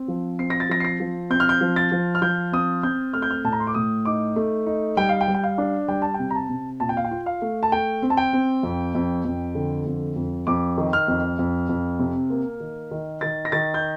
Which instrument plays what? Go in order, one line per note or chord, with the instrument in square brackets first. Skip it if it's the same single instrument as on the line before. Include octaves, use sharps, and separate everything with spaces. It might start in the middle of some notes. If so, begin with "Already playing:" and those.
Already playing: [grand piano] C4
F3
C4 C7
A#6
A6
F3 A#6
C7
A#6
F3
C4 G6
F6
G6
F3
A6
F3
F6
F3 G6
C4 D#6
C4 G6
A3 F6
G6
F6
A2 A5
A#5
C6
D6
A2 D#6
D#4 D6
A3
D#4
G3 G5
F5
G5
G3
G5
F5
D4
G3 G5
A5
C3 G5
A#5
A5
C3
A#2 A5
G5
F5
G5
F4
F5
A3
A5
A3 G5
C4
A5
G5
C4
F2
F2
F2
D3
F2
F2
F2 D6
D#3
F6
F2
F2
F2
C3
A#3
D#3
D#3
D#3 A6
A#6
D#3 A6
G6